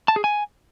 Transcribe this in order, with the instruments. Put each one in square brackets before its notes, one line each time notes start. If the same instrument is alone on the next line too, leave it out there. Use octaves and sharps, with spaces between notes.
[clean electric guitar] A5
G#4
G#5